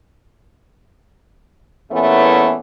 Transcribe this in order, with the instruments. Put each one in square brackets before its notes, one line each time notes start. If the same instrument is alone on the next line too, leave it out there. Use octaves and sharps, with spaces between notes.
[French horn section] E2 A#2 E3 A3 B3 C#4